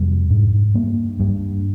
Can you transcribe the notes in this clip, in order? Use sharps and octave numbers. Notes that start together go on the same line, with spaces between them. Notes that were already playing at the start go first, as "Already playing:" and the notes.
Already playing: F2 C3 G3
G#2
G2 A#3
G2